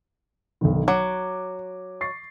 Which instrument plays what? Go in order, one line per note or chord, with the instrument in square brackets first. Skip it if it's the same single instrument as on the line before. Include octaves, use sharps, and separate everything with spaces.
[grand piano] B1 D3 D#3
[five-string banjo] F#3 [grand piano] D6
[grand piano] C#6 A6 C7